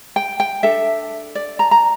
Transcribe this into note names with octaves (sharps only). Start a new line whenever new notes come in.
G5
G5
D4 A4 E5
D5
A#5
A#5